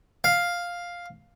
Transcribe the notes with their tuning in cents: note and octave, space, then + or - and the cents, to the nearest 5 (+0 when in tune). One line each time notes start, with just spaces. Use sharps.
F5 +5